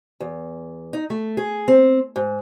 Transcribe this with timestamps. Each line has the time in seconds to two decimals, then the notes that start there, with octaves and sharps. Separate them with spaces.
0.20 E2
0.93 D#4
1.10 A3
1.37 G#4
1.68 C4
2.16 G#2